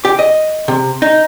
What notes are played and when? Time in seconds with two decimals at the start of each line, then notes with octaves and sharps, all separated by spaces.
0.05 G4
0.19 D#5
0.68 C3
1.02 D#4